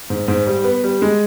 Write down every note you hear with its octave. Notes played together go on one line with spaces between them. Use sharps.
G#2
G#2
G3
B3
G3
G#3